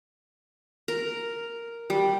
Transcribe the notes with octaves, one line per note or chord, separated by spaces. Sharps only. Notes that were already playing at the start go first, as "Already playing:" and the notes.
A#4
G3